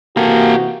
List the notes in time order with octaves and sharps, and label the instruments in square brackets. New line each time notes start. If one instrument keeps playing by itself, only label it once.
[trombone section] C3 E3 F#4 [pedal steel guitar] A#3 [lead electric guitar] G4 A4